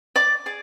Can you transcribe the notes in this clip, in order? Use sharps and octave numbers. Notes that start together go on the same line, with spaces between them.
D5 D6
G#4 D5